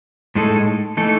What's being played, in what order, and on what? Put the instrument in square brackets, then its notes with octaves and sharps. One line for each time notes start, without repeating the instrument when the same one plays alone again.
[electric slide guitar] A2 G#3 D#4 A4
E3 A3 D#4 A4